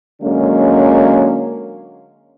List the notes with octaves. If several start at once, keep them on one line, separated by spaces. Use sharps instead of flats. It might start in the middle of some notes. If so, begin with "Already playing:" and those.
D3 F#3 G#3 A#3 C#4